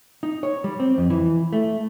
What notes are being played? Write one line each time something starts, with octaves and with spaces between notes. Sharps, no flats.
D#4
C#5
G3
C4
F2
E3
A3